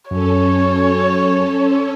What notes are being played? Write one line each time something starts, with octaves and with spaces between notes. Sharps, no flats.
F#2 C#4 A4 C#5